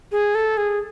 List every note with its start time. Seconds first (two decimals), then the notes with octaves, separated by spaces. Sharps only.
0.12 G#4
0.35 A4
0.57 G#4